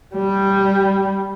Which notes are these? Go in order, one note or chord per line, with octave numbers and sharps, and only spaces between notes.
G3